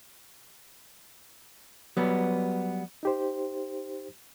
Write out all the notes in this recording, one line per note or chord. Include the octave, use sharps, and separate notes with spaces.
F#3 G3 B3
D#4 G4 C5